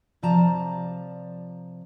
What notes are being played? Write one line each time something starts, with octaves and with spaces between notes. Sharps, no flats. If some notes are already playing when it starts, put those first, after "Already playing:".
C3 F3 D5 A5 A#5